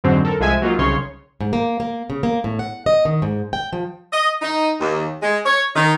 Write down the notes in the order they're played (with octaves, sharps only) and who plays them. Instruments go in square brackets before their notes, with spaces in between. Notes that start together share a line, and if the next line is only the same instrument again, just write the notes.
[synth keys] F2 G#2 D3 F#3 C4
A4 A#4
C2 F3 G#3 E5 G#5 E6
F#3 A#3 D#4 F4
C2 C#3 C#5 C6
[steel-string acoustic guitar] G#2
A#3
A#3
C#3
A#3
A2
F#5
D#5
D#3
G#2
G5
F3
[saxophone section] D#5
D#4
D#2
G#3
C#5
D#3